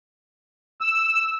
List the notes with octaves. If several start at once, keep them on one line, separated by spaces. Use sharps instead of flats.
E6